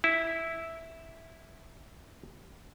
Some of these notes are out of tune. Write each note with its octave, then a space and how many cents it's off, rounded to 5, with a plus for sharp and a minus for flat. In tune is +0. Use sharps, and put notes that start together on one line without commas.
E4 -5